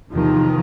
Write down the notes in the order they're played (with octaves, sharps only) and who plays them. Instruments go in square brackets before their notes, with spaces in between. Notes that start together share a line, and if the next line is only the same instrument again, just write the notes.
[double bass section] E2 C3 D#3 F3